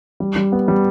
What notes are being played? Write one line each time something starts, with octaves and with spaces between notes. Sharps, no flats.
G3
G3
B3
G3